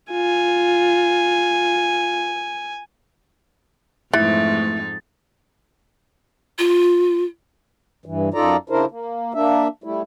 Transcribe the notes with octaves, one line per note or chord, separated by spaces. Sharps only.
F4 G#5
F2 G#2 E3 A3 D#4 A6
F4
G2 E3
F#2 D#4 F4 A4 D5 A#5
C#3 D4 E4 A#4 C5
A#3
A#3 D4 E5
G3 A3 E4